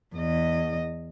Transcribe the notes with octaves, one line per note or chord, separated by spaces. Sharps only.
E2 D#5